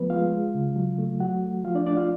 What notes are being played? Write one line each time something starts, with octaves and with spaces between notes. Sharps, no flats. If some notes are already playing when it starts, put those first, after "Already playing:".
Already playing: F3 A3 B3 B4
G#3 F4 F5
G#3
C#3
F#3
A3
F#3 F#4 F#5
A3
F3 F4 F5
D4 D5
A3 D4 D5
F4 F5